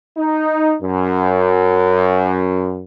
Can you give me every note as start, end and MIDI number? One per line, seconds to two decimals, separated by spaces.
0.17 0.74 63
0.81 2.84 42